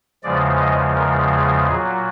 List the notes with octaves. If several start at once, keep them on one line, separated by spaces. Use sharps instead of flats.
E2 C#3 F3 G#3 D5
D#5
A#4
G#4
A#2 F#3 G#4